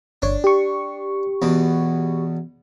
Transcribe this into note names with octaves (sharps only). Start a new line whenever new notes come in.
G1 D4 C#5
G4 C#6
E2 B2